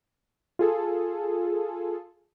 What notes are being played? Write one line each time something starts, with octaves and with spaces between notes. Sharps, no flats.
F4 G#4 A4